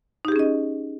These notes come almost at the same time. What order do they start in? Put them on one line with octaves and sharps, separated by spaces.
D#4 G4 G#4 C#4 D#5